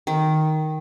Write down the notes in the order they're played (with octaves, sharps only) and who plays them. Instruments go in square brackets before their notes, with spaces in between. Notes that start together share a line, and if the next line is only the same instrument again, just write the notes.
[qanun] D#3